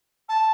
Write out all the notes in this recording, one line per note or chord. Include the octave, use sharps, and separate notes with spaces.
A5